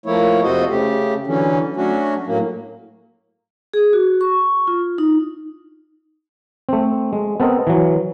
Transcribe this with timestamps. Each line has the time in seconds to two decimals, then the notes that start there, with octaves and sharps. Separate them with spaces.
0.06 F3 A3 A#3 E4 C#5
0.43 F2 C3 F#4 A4 C5 D#5
0.69 C#3 A3 G4
1.27 D3 E3 F#3 C#4
1.76 F#3 A3 C#4 D4 F#4
2.27 A2 F#3 A#3
3.74 G#4
3.93 F#4
4.21 C#6
4.67 F4
4.98 D#4
6.69 A3 C4
7.13 G#3
7.40 B3 C4 A4 A#4 D#5
7.67 E3 F#3